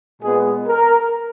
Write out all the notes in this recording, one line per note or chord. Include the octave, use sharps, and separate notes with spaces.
A#2 G#3 B3 G#4
A#4